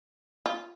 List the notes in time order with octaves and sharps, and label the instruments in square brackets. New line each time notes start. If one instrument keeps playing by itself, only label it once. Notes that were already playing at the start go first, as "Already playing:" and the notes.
[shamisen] F4